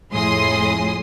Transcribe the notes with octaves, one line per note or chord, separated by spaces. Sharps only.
F2 A2 G#4 C6 D#6